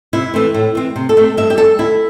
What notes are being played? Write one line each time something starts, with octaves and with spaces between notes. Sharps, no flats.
C3 E4
E3 A3 C4
A2
E3 C4
C3
A4
A3 C4
G2 E5
G4
G3 C4 A4
D2 E4